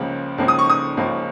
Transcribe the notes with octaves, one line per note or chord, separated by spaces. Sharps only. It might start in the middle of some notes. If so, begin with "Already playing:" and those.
Already playing: C#2 C#3 F3 A#3
C#2 C#3 F3 A#3
D#6
C#6
D#6
C#2 C#3 F3 A#3